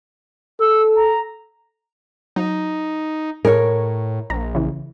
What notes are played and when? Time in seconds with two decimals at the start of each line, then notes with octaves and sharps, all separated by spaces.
0.60 A4 E6
0.96 A#5
2.36 F#3 D#4
3.45 A2 G#4 A#4 C#5
4.30 A#1 A#5
4.55 C#3 E3